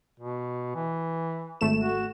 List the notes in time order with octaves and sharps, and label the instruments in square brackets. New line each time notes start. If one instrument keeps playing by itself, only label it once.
[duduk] B2
E3
[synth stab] G#1 A3 E7
[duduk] F#4